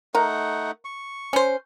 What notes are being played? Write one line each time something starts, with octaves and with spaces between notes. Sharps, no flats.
A3 D#4 A#4 F#5 A#5
C#6
C#4 C5